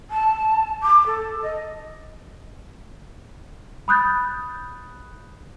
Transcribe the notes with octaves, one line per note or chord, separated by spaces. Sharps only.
A5
D6
A4
D#5
B5 D#6 F#6 G6 A6